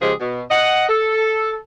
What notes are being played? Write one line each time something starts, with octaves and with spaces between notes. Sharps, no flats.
C#3 F3 G#3 G4 G#4 C5
B2
D#5 F#5
A4